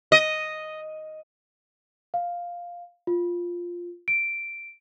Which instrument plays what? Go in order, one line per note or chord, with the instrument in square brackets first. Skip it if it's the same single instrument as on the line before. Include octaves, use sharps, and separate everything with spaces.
[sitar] D#5
[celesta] F5
F4
D7